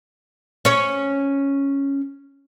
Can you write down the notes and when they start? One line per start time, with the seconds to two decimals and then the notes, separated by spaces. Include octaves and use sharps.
0.65 C#4 C#5